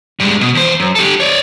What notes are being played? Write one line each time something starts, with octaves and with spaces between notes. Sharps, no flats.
G2 G#3
B2
E2 C5
F#2
G4 A4
C#5 D5